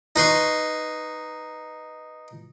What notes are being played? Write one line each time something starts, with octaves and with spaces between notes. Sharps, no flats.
D#4 B4 C6 C#6